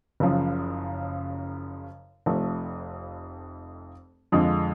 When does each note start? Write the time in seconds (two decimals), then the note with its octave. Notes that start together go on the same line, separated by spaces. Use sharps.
0.20 F#1 F#2 C#3 F3
2.26 F1 F2 F3 A3
4.32 F2 D3 F3 G#3